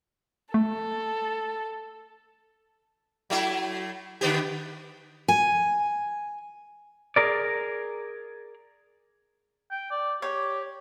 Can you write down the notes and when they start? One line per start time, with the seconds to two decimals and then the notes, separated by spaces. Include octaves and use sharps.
0.54 A3 A4
3.30 F#3 A3 E4
4.21 D3 B3 G4
5.28 G#5
7.16 G#4 A#4 D5
9.71 G5
9.91 D5
10.22 G4 C#5